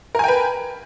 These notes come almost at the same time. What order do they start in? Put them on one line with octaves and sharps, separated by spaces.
A#4 G#5 G5 B4